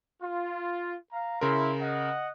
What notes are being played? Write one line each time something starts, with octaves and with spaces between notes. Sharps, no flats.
F4
F5 A#5
C#3 E4 A#4 C6
D#5 F#5